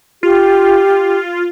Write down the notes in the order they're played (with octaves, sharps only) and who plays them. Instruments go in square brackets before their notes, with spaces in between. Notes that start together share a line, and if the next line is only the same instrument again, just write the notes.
[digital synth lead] F4 [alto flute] G4